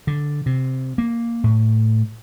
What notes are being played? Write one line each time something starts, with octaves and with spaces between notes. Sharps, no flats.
D3
C3
A#3
A2